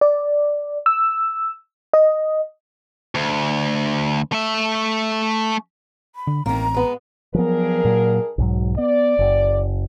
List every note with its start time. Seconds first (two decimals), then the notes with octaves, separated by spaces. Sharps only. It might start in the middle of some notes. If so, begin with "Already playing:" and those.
0.01 D5
0.86 E6
1.93 D#5
3.15 D2
4.32 A3 E5
6.16 B5
6.27 D3
6.46 A1 D#3 A#3 C4 A#5
6.74 G#3 B3
7.34 G2 F3 F#3 B3 G#4 A#4
7.85 A#2 F#3
8.38 B1 G#2 F#3
8.78 B3 D5
9.19 F#1